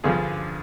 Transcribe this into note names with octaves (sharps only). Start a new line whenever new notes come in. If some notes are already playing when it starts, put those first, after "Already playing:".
G2 D3 F3 G#4